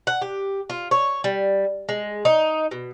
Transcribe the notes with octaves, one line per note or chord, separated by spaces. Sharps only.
F#5
G4
F4
C#5
G3
G#3
D#4
B2